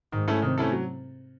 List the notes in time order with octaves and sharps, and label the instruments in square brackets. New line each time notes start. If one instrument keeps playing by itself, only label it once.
[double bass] G#2 [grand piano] D#3
[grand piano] A3 C#4 E4 A4
[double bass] C3 [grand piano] D#3
[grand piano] A3 C#4 E4 A4
F#3